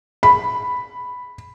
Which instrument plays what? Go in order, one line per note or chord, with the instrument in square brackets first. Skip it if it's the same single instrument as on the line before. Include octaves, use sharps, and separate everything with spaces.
[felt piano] B5